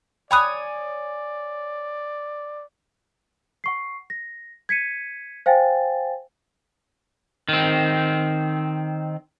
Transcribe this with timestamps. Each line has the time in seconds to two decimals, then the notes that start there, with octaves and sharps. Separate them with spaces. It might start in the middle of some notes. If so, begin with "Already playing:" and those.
0.31 C#5 D5 G5 G#5 B5 D#6 F#6
3.64 F#5 C#6 C7
4.10 A#6
4.69 G#6 B6 C#7 D#7
5.46 C5 F5 G5 G#5 A6
7.49 D#3 C4